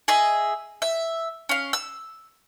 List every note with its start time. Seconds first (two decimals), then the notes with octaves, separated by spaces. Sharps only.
0.08 G#4 D#5 E5
0.82 E5
1.49 C#4 F5
1.73 E6